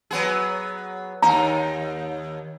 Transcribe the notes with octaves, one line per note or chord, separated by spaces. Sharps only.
F#3 B3 G#4
D#2 D#4 A#5